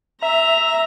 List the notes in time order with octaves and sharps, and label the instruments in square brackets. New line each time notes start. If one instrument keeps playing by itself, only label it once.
[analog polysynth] E5 [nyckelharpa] A#5